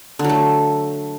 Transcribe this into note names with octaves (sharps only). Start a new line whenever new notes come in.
D3
F#3
A3